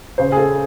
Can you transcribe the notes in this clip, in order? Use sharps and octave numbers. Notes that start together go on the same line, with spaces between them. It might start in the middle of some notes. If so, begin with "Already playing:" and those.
C#3 C5
G#4
A4